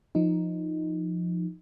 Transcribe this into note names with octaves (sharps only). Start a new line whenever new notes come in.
F3 D#4